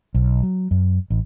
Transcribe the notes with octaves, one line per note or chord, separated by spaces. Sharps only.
B1
F#3
F#2
A1